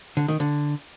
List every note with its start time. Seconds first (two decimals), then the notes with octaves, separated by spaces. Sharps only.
0.17 D3
0.28 D#3
0.40 D3